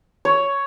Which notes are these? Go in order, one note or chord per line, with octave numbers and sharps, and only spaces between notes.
C#5